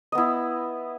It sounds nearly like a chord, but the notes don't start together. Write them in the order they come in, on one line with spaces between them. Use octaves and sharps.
D#5 B3 E4